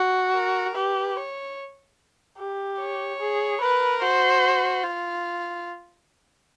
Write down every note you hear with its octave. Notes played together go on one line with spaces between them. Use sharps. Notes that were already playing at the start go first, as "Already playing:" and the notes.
Already playing: F#4
A#4
G4 B4
C#5
G4
C#5
G#4
A#4 B4
F#4 C5
F4